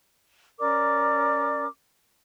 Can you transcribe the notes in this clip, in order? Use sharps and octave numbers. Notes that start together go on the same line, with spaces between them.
C#4 A#4 D5 D6